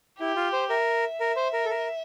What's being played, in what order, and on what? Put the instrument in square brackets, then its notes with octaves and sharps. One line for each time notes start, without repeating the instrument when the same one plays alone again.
[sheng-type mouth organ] E4 [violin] G4
[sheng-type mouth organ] F4
C5
[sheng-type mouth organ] A#4 [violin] E5
[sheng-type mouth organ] A#4
C5
A#4
A4
A#4